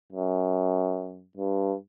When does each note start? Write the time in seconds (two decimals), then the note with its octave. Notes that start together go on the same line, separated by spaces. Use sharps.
0.12 F#2
1.37 G2